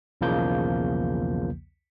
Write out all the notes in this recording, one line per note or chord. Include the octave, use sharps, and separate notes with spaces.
B1 E2 C#3 F3 A#3 G6